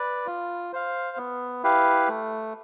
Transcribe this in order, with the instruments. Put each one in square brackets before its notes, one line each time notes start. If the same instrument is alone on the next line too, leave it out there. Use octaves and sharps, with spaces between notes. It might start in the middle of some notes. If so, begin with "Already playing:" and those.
Already playing: [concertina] B4 D5
F4
C5 F5
B3
E4 G4 B4 F5
A3